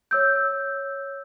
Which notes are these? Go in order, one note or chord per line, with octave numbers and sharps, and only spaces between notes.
C#5 E6 G6